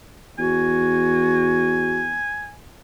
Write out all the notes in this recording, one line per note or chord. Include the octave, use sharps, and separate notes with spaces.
E2 F#4 G#5